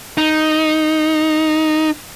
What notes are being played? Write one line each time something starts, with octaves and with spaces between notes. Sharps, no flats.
D#4